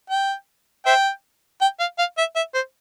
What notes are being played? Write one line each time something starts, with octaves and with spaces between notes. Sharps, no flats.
G5
C5 E5 G5
G5
F5
F5
E5
E5
C5